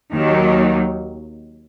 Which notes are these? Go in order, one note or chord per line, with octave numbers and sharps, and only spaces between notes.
D#2 D#3 F#3